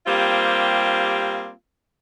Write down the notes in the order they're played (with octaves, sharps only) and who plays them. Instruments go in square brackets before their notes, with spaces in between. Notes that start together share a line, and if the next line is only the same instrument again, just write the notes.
[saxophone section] G3 A#3 C4 F4 G4